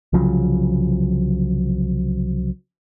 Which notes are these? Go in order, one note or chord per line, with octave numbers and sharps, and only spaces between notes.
C2 C#3 F3 F#3